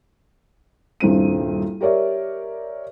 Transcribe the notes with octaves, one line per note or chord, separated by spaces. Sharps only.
D#1 C2 G2 C5 D#7
G4 A#4 C#5 D5 E5